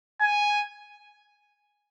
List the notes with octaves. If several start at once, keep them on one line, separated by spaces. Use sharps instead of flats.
G#5